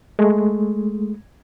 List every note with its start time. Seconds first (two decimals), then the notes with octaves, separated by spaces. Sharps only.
0.19 G#3 A3